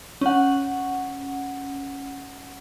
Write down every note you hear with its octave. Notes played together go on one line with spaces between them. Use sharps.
C#4 F#5